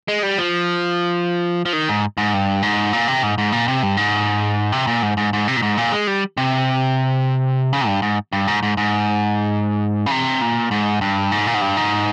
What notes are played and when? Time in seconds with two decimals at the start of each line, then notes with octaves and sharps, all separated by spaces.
0.08 G#3
0.23 G3
0.38 F3
1.65 F3
1.73 D#3
1.89 G#2
2.17 G#2
2.34 G2
2.63 G#2
2.93 A#2
3.08 C3
3.23 G#2
3.38 G#2
3.52 A#2
3.68 C3
3.83 G2
3.97 G#2
4.72 C3
4.87 A#2
5.03 G#2
5.17 G#2
5.33 G#2
5.48 C3
5.57 A#2
5.62 G#2
5.77 A#2
5.92 G#3
6.07 G3
6.37 C3
7.73 C#3
7.87 G2
8.02 G#2
8.33 G2
8.47 G#2
8.63 G#2
8.77 G#2
10.06 C#3
10.11 C3
10.41 A#2
10.71 G#2
11.01 G2
11.32 G#2
11.47 A#2
11.54 G#2
11.61 G2
11.77 G#2